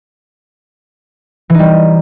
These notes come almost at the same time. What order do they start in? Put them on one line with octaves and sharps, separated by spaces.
E3 D#4 G3